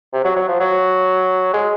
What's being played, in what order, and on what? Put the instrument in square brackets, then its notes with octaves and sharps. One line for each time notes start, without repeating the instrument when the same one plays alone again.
[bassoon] C3
F#3
F#3
F3
F#3
G#3